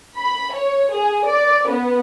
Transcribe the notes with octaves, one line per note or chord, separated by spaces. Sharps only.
B5
C#5
G#4
D5
B3